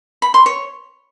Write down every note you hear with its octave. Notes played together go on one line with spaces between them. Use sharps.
B5
C6
C#5